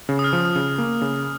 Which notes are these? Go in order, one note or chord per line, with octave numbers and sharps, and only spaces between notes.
C#3
D#6
F6
F3
C#3
A#3
C#3